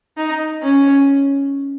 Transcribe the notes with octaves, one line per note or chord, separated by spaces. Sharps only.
D#4
C#4